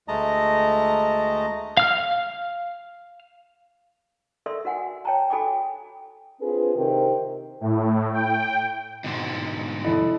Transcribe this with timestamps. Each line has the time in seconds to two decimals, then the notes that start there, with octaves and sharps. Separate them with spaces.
0.08 D2 G#3 A3 D#5 A5 A#5
1.77 F5 F6
4.46 A4 A#4 D5 E5 C6
4.65 F#4 A#4 F#5 G#5
5.05 C#5 G5 A5 A#5
5.30 F#4 A4 G5 G#5 B5 D6
6.41 C4 D4 F4 G#4 B4
6.75 C3 D#3 C4 G4 A#4
7.61 A2
8.13 G5
9.04 G#2 B2 D3
9.85 F1 E4 A4 D#5